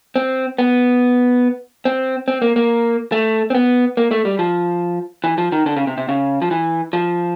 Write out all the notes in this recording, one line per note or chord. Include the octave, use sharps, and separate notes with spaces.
C4
B3
C4
C4
A#3
A#3
A3
C4
B3
A#3
A3
G3
F3
E3
F3
D#3
D3
C#3
C3
C3
C#3
F3
E3
F3